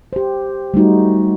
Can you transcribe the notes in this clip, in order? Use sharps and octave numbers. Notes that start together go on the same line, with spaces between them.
G4 C5
G3 A3 D#4 F#4